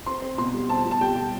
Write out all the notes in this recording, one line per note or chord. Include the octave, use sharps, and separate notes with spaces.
C4 C6
C4
B2 C6
G3
C4 A5
B2
A5
G3 G5
G3